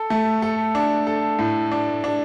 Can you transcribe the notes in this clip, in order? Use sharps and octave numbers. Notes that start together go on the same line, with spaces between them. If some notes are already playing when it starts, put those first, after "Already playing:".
Already playing: A4
A3
A4
D4
A4
A2
D4
D4